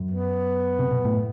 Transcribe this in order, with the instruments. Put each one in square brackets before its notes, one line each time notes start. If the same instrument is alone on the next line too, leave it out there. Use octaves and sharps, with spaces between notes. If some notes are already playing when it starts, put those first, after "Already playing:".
Already playing: [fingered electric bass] F#2
[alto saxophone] B3
[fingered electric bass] C3
B2
A2